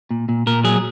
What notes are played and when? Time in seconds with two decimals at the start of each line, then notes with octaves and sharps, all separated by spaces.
0.11 A#2
0.29 A#2
0.47 A#2 A#4
0.64 F#3 G#4